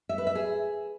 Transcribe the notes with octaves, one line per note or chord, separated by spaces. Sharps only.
E5
B4
E5
G#4